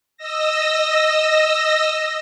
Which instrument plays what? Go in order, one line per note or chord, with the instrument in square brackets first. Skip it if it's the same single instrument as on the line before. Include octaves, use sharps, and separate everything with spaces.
[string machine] D#5 E6 A#6